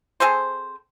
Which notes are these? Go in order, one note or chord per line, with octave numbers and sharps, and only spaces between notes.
C4 G#4 A4 C5